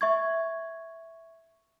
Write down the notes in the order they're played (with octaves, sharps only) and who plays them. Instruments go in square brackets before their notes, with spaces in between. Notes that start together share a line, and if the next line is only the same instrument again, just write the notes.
[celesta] E5 C#6 G#6